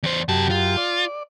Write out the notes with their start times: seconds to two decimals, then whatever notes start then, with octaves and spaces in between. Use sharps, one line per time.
0.03 E2 C5
0.28 F#2 C3 G4 A5
0.50 F4
0.77 D5